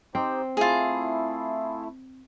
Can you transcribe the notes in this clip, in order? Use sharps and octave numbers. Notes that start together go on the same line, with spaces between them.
C4 D#4 G4 C5
A3 E4 F4 G#4